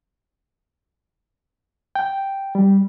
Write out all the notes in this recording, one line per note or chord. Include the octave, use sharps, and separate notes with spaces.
G5
G3